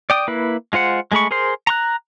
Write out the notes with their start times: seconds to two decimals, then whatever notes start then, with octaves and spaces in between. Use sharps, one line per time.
0.10 D5 G5 D#6
0.28 A#3 E4 B4
0.73 G#3 F4 C5 F#5
1.12 G#3 A3 G#4 B5 C#6
1.31 G#4 A#4 C5 C6
1.67 A#5 C6 F#6